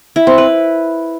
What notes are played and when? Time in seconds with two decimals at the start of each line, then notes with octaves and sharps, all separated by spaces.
0.16 E4
0.27 C4
0.38 B4